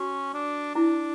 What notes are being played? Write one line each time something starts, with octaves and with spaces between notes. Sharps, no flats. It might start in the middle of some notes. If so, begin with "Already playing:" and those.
Already playing: C#4 F#4
D4
D4 E4